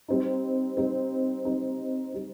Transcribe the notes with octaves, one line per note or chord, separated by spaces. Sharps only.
G3 C4 D#4
G3 C4 D#4
G3 C4 D#4
G3 C4 D#4